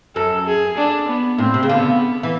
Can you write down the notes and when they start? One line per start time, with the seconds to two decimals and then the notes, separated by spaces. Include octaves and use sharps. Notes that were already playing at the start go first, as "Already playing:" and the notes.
0.15 F#2 A4
0.46 G#4
0.77 D4
1.08 B3
1.38 A2 C4
1.54 C3
1.63 C#3
1.69 D3 B3
2.23 E3